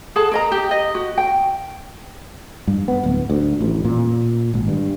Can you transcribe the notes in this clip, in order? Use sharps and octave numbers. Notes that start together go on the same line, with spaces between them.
G#4 A4 F#5 A5
A#4 D#5 A#5
G4
D#5
F#4
G5
G2
B3
D1
D2
A1
A#2
G#1
G2